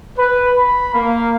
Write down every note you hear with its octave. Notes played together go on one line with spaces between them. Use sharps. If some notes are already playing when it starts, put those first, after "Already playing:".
B4
B5
A#3